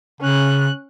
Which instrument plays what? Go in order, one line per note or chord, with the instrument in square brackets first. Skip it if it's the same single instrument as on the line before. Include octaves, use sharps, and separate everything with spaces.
[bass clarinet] C#3 [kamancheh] C#4 F#6